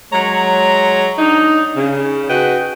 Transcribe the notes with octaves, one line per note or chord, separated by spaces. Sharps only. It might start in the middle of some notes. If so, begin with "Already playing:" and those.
F#3 G#3 C#5 A#5
D4 D#4
C#3
F#4 G#4 B4 D#5 F#5 G5